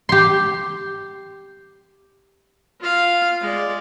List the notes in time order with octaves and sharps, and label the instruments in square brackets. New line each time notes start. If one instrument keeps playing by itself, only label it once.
[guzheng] G4 C6
[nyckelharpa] F4 F5
G#3 D5